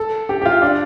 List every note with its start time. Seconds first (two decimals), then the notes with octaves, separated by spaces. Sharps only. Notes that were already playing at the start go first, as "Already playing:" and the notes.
Already playing: A4
0.29 G4
0.42 G4
0.46 F4
0.62 D4